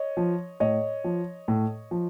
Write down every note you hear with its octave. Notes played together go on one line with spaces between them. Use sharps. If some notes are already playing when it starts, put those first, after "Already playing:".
Already playing: C#5 D#5
F3
A2 C#5 D#5
F3
A2
F3